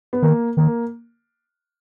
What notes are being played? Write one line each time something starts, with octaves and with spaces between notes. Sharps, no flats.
B3
D#3 A#3
D#3 A#3